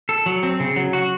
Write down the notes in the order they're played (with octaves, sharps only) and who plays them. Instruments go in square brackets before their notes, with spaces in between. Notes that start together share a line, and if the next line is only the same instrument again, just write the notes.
[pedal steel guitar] A4
F#3
C4
C#3
F#3
F#4